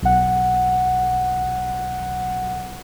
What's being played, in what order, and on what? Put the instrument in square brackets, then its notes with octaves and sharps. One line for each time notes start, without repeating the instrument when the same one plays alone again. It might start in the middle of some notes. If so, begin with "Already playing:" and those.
[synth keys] B1 F#5